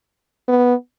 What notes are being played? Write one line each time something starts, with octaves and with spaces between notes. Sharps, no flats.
B3